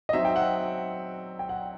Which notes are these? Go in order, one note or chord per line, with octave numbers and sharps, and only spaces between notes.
D#5
F#3 C4 D#4 E5
G5
F#5
G5
F#5